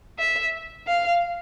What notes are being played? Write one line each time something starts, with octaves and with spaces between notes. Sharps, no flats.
E5
F5